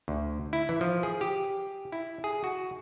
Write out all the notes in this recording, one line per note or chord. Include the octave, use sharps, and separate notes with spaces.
D2
E4
E3
F3
G#4
G4
E4
G#4
F#4